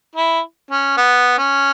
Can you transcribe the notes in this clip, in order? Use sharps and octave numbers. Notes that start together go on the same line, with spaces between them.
E4
C#4
B3
C#4